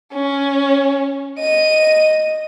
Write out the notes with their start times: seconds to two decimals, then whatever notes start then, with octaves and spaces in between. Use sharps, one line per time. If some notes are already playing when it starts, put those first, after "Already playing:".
0.14 C#4
1.40 D#5 D#7